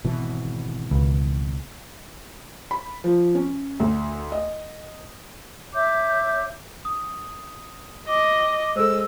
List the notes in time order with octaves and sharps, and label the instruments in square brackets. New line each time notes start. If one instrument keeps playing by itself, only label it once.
[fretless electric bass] G#1 B2 E3
[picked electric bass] C#2
[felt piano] B5
F3
C#4
D2
D#5
[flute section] C#5 E5 D6 G6
[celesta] D#6
[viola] D#5 [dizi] D6
[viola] G#3 [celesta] A4 C5 [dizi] E6